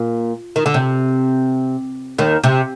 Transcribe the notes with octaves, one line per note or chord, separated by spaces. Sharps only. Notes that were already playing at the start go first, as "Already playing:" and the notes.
Already playing: A#2
D#3
D3
C3
D#2 D#3
C3